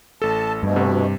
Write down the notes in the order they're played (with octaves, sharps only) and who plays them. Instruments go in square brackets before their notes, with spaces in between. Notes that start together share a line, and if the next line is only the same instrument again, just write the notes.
[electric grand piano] A1 A4 [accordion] A5
[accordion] D2 B2 [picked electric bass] G2
[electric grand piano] C3